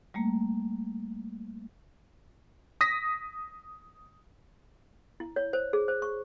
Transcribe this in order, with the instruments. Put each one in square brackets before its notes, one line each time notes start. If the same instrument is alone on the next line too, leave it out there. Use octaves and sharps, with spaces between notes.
[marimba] G3 A3 A#3
[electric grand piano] D#6 A#6 B6
[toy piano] E4
C#5
C5
G#4
C5
C#6